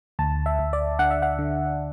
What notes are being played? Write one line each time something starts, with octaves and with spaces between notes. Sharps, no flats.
D2 A5
E5
D2
D5
D3 F#5
E5
F#5
D3